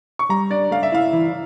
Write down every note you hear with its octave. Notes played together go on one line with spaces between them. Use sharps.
C#6
G3 A#5
D4 D5
A3 F5
E5
E4 F5
E3